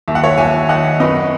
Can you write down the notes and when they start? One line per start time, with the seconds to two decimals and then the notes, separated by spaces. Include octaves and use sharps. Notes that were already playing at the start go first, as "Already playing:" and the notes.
0.08 D#2 E5
0.15 F#5
0.24 C#5 E5
0.38 D#2 E5 G#5
0.69 D#2 D#5 F#5
1.00 F#2 B4 D#5